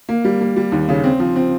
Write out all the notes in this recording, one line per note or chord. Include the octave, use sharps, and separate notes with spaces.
A#3
G3
A#3
G3
D#2
C#3
C4
F3
C4